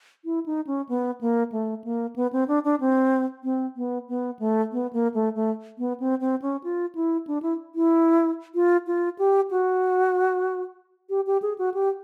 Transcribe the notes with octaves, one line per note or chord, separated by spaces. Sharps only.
E4
D#4
C#4
B3
A#3
A3
A#3
B3
C4
D4
D4
C4
C4
B3
B3
A3
B3
A#3
A3
A3
B3
C4
C4
C#4
F4
E4
D4
E4
E4
F4
F4
G4
F#4
G4
G4
G#4
F#4
G4